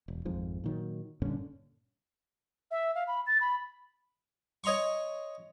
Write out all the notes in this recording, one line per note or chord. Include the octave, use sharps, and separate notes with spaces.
E1
G#1 F2 G#2 F3
A#2 D#3 F#3
G2 A#2 D3 C#4
E5
F5
B5
A6
B5
C#5 D#5 A#5 C6 C#6